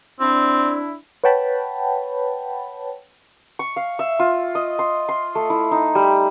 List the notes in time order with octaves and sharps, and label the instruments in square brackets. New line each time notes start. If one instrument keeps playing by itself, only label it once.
[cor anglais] C4 [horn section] D4 E4
[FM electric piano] B4 C#5 F#5 G5 A5 B5
[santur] C#6
F5
E5
F4
D#5
C6
C6
A3
E4
D#4
G3